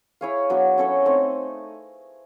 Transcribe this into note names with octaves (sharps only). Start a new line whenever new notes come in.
E4 G#4 C#5 F5
F#3 B3 D4
C#4 E4 A4 C#5
A3 C4 D#4